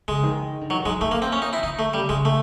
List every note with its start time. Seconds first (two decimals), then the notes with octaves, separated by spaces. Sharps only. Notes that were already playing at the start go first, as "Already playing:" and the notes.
0.08 C#3 G#3
0.23 D#3
0.61 D3
0.70 D#3 F#3
0.85 D#3 G#3
1.01 D#3 A3
1.11 A#3
1.22 C4
1.32 C#4
1.42 D#4
1.53 E4
1.63 D3 D#4
1.79 A3
1.94 C#3 G3
2.09 C#3 G#3
2.25 A3